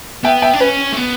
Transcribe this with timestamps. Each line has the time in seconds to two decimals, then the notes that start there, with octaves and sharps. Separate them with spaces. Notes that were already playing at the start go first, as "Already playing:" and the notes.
0.24 B3 E5 G5
0.42 E5 G5
0.53 D4
0.60 C#4 B4
0.92 A3
0.97 B3